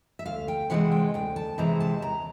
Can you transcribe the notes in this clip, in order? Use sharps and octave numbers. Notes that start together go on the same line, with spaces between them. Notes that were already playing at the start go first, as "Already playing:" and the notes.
E5
D2 F5
G5
C3 E3 G#3 C4 F#5
G5
D2 G5
A5
C3 E3 G#3 C4 A#5
A5
D#2 A#5